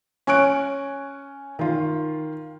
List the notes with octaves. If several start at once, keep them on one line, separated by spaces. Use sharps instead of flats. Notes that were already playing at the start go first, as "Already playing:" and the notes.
C#4 G#5 C#6 F#6 D7
D#3 F4